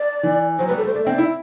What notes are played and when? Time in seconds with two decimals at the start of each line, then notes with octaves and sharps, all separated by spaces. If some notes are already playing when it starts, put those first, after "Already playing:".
Already playing: D5
0.23 E3
0.59 F#3 C5
0.67 B4
0.71 G3
0.77 A4
0.82 A3
0.86 C5
0.94 A3 D5
1.03 E5
1.07 C4 D5
1.18 E4 E5